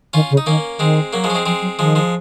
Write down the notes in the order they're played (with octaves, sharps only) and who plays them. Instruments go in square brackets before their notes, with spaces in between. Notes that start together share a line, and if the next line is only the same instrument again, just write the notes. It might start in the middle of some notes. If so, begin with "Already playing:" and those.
[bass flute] D#3 [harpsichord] C#4 F4
[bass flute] C#3
[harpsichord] D#4
[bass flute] D#3 [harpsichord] A#3 C#4
[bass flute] D#3 [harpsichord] G#3 C4
[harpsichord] F#3 A#3
F3 G#3
C#4
G#3 C4
[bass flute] F3 [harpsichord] G#3 C4
[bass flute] F#3
[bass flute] D#3 [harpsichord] F3 G#3
[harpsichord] F3 G#3